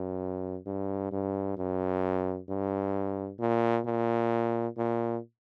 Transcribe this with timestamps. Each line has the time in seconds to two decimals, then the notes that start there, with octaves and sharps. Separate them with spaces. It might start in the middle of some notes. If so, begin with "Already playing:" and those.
Already playing: F#2
0.66 G2
1.12 G2
1.57 F#2
2.49 G2
3.40 A#2
3.86 A#2
4.77 A#2